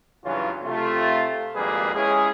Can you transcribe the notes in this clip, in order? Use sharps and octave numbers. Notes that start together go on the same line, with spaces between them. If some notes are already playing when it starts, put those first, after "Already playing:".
G2 C#3 E3 F#3 C#4 F4
C3 A3 F4
G#1 F2 G3 A#3 G#4 B4
G#3 C#4 E4 G#4